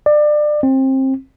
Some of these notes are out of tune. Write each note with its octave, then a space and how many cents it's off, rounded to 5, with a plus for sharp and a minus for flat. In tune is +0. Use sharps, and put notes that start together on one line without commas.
D5 +25
C4 +25